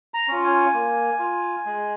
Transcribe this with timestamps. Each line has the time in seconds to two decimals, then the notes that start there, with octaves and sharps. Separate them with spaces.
0.14 A#5
0.29 C#4 F4
0.44 G#5
0.74 A#3
1.19 F4
1.66 G#3